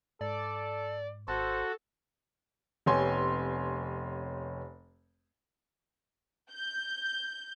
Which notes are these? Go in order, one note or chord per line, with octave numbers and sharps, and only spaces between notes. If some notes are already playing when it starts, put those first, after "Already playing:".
G#2 A4 D5
G#1 F#4 A4 C5
F1 B3 G4 C#5 G#5 C6
G6